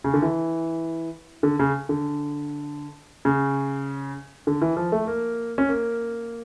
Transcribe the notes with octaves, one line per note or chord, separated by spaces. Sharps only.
C#3
D3
E3
D3
C#3
D3
C#3
D3
E3
F3
A3
A#3
C#4
A#3